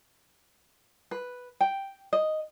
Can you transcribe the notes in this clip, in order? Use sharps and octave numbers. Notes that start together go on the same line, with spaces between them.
B4
G5
D#5